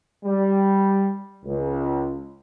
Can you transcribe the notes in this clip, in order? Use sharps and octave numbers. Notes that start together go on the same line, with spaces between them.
G3
C#2